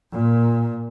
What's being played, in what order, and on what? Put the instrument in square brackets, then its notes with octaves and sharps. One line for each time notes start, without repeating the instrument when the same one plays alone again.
[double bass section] A#2